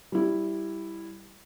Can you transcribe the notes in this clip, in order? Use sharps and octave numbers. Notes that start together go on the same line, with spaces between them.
G3 E4